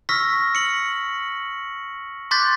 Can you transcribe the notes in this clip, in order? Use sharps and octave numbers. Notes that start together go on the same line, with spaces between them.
C#6 E6 F6 A#6 B6
C#7 F#7
C6 D6 F#6 G6 A6 B6